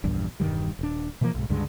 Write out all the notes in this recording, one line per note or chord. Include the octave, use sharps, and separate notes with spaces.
A#1 E2 G2
E1 G2 D#3 G3
D#1 D4
B2 E3 F3 A#3
B1 G#2
C#2 G2 D3 G#3